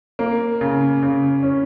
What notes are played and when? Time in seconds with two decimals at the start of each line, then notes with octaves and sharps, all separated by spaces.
0.19 A#3
0.61 C#3
1.02 C#3
1.43 C#4